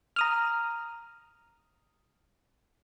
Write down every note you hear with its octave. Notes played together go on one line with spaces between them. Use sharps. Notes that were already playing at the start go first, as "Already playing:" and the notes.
A#5 D#6 F6